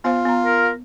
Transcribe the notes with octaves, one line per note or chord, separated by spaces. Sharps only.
B3 F4 C5 F5
B3 A#5
A#4